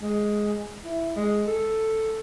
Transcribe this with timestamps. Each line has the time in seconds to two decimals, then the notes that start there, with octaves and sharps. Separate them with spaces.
0.02 G#3
0.84 E4
1.16 G#3
1.47 A4